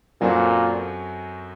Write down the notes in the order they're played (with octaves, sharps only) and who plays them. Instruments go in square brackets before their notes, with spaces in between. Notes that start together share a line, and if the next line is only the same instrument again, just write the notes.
[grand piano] F#2 F#3 C4 F#4 A4 [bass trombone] A#2